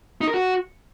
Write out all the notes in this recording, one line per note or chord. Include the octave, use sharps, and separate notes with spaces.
D#4
A#4
F#4